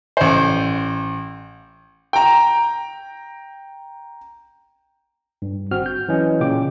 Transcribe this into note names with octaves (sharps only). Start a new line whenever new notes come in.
A1 C5
G5 A#5
G2
G#1 C4 F#4 F6
G6
E3 F#3 C#4 D#5
A#2 C#3 G5 D6